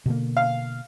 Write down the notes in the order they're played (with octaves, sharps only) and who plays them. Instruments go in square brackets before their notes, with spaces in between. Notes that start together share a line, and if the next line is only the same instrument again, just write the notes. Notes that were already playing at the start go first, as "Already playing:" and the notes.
[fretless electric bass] B2 D3 A#3
[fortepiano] F5